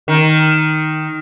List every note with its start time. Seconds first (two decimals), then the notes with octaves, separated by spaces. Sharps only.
0.08 D#3